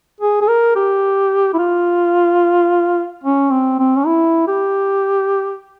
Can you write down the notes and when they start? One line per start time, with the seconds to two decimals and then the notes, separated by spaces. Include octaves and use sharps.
0.21 G#4
0.41 G#4
0.48 A#4
0.76 G4
1.54 E4
1.58 F4
3.24 C#4
3.51 C4
3.79 C4
3.97 C#4
4.07 E4
4.47 G4